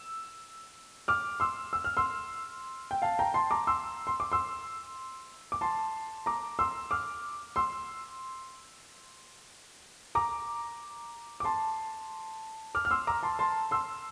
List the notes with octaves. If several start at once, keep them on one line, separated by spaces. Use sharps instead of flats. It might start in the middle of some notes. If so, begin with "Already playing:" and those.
Already playing: E6
D6 F6
C6 E6
E6
F6
C6 E6
G5
F5 A5
G5 A#5
A5 C6
A#5 D6
C6 E6
C6
D6
C6 E6
D6
A5 C6
A#5 D6
C6 E6
D6 F6
C6 E6
A#5 D6
D6
A5 C6
D6 F6
F6
C6 E6
A#5 D6
A5 C6
A5 C6
C6 E6